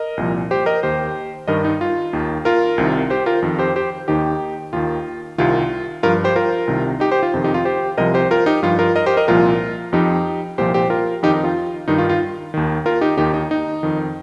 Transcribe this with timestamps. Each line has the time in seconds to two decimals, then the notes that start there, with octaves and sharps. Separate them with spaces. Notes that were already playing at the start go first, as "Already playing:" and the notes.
Already playing: A#4 D#5
0.17 C2 A#2 F3
0.51 G4 C5
0.66 A#4 D#5
0.83 D#2 D#3 G4 C5
1.48 G2 D#3 A#4 D#5
1.64 D#4
1.81 F4
2.13 D#2 D#3
2.45 F4 A#4
2.78 C2 C3 D#3
3.10 G4 C5
3.26 F4 A#4
3.42 F2 D#3
3.59 G4 C5
3.76 G4 C5
4.08 D#2 D#3 D#4 G4
4.73 D#2 D#3 F4
5.38 C2 C3 D#3 F4
6.03 G2 F3 F4 A#4
6.24 G4 C5
6.36 F4 A#4
6.67 C2 C3 D#3
7.00 D#4 G4
7.12 G4 C5
7.23 F4
7.34 F2 C3 D#3
7.44 D#4 G4
7.54 F4
7.65 G4 C5
7.97 C2 C3 F3 A#4 D#5
8.14 G4 C5
8.31 F4 A#4
8.46 D#4 G4
8.63 G2 F3 F4
8.79 F4 A#4
8.96 A#4 D#5
9.06 G4 C5
9.17 A#4 D#5
9.28 C2 A#2 F3 F4 A#4
9.92 F2 F3 D#4 G4
10.58 C2 A#2 F3 G4 C5
10.74 G4 C5
10.90 F4 A#4
11.23 F2 D#3 D#4 G4
11.34 D#4
11.44 F4
11.88 G2 D#3 D#4
11.98 F4
12.09 F4
12.54 D#2 D#3
12.86 F4 A#4
13.01 D#4 G4
13.18 D#2 D#3 D#4 G4
13.34 D#4
13.51 D#4
13.83 F2 D#3